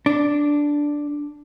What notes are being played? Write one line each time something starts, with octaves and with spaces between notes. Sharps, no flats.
D4